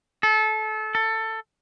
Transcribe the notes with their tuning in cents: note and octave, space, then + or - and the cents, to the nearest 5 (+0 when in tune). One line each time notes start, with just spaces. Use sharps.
A4 -25
A4 +15